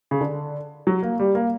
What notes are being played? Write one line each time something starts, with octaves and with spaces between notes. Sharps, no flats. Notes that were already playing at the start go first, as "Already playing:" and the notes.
C#3
D3
F#3
A#3
G3
A#3